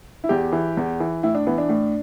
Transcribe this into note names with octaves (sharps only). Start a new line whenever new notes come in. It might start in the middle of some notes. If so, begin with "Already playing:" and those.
E4
E2 G4
E3
E2
E3
A2 E4
D4
E3 B3
D4
A2